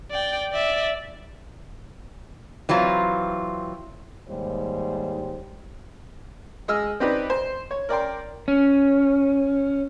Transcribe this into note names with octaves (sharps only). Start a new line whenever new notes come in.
D5 G5
D5 E5
E3 F#3 C4 F4
D#2 G#2 G3 C5
G#3 D#5 E6 F6
C4 D#4 G4 B4 D5
C5
C#5
A#4 D5 G5 C6
C#4